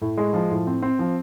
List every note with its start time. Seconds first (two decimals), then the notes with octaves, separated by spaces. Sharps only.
0.01 A2
0.17 G#3
0.33 F3
0.51 A2
0.67 C4
0.83 C4
0.99 F3